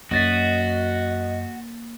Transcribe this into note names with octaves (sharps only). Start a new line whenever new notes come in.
F#2 A#3 F#4 D#5 A6 B6